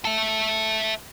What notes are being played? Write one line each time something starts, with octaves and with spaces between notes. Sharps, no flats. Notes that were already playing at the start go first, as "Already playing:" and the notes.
A4 E5